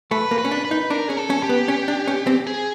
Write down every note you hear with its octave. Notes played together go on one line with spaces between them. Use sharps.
A3 B4
A#3
B4
C#4
D4
B4
D#4
D4 A#4
C#4 G#4
A4
C#4
G4
B3
C#4
D4
C#4
C4
G#4